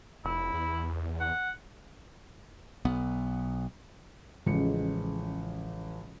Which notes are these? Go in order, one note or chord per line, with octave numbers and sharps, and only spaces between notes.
F1 E4
E2
F#5
B1 B3
A1 C#3 F3 G#3 C#7